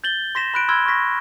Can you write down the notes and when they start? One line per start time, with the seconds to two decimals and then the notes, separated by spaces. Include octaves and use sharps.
0.04 G6 A6 F#7 G7
0.35 C6 A#6 B6 E7
0.54 B5 F#6 D7
0.69 B5 C6 E6 F6 G#6 G7
0.86 C#6 F6 A#6 B6